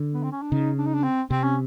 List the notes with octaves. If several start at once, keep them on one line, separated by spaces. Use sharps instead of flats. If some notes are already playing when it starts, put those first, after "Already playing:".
Already playing: D3
B3
C4
C#4
D4
C#3 D#4
D4
D#4
D4
C4
C3 C4
C#4